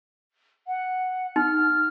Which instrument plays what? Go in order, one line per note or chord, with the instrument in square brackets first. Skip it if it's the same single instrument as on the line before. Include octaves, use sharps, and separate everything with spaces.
[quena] F#5
[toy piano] D#4 [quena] F6